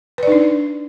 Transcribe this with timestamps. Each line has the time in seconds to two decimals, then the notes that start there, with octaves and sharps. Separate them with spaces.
0.18 B4
0.23 D5
0.27 D#4
0.32 D4